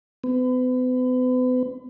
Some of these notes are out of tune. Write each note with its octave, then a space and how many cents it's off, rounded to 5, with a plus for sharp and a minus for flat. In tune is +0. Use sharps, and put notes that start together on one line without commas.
B3 +40